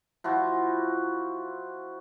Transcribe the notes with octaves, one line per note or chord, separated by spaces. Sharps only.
F3 E4 F#4